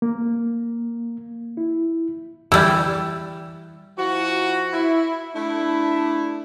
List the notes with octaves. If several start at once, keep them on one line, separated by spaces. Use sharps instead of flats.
A#3
E4
E3 G3 E6
F3 E4 F#4
E4
A3 D4 E4